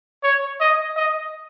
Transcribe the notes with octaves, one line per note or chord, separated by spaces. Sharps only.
C#5
D#5
D#5